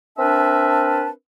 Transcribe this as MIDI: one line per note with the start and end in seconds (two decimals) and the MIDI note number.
0.19 1.10 60
0.19 1.10 62
0.19 1.10 70
0.19 1.10 71
0.19 1.10 76
0.19 1.10 81